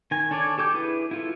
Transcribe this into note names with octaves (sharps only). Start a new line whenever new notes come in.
D#3 G#5
D4 A4 C#5 D5 G#5
G4 A4 D6 G6
E4 G#4 B4
E4 F4 A4